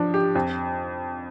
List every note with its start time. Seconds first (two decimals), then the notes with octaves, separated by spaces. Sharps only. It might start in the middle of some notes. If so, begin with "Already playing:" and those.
Already playing: F3 D4
0.14 G4
0.35 F2